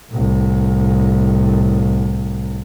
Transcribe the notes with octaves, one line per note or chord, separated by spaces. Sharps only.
C2 A2